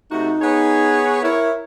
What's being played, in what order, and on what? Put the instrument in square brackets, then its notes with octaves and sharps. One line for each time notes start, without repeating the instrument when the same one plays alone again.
[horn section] C3 A3 F#4 [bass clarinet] D#4
[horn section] B3 G#4 C#5
[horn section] E4 C#5 [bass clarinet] A#4